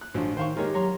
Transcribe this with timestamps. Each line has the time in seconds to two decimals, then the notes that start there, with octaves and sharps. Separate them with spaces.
0.01 F#6
0.14 A1 F3 F#3 D4
0.37 D#3 D#4 C5 F5 C#6
0.57 D#3 G#3 G4 A#4 C#5
0.74 F#3 C#5 A#5 C6